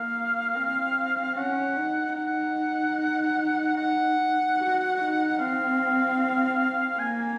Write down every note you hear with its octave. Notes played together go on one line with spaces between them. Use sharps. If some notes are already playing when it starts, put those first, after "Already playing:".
Already playing: A#3 F5
C4
C#4 F#5
D#4
D#4 F#5
F#5
F#4
D#4
C4 F5
A#3 G#5
G#5